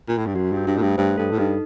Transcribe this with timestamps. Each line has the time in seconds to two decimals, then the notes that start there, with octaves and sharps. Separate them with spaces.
0.08 A#2
0.18 A2
0.26 G2
0.35 F#2 F#4
0.52 G2
0.57 D4
0.67 G2
0.77 A2 A3
0.82 G2
0.97 G2 C5
1.18 G2 A4
1.31 A2
1.38 G2 D#4